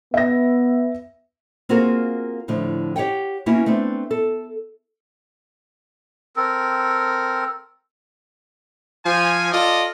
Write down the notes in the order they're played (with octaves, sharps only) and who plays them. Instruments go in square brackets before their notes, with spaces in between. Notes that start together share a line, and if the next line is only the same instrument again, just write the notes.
[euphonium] B3 [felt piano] E5 A#6
[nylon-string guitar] A#3 C4 F4 F#4 G#4 A#4
A2 D3 F3
G4 C#5 F#5 G5
A#3 B3 C#4 E4 F#4
A3 B3 C4 D4
A4
[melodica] C4 A4 A#4
[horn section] F3 G#5
F4 A4 D5 D#5